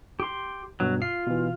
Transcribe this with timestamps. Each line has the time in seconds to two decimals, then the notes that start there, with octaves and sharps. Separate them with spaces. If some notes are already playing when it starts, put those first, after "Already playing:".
0.20 G4 C6
0.80 G2 B2 F#3
1.02 F4 C7
1.27 B2 E3